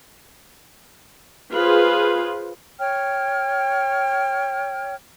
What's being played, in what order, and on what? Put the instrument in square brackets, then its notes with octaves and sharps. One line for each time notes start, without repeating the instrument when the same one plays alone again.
[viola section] F4 G#4 B4 C5
[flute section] C#5 G5 F6